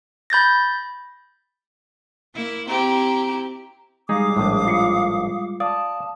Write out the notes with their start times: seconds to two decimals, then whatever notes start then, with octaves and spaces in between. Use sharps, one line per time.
0.30 B5 G6 A6 A#6
2.34 A#3 E4
2.68 C4 E4 G4 A#5
4.09 G3 G#3 D#4 G#4 F5 D6 D#6
4.37 A#1 A2
4.66 F4 C7 C#7
5.60 D5 F5 A5 D#6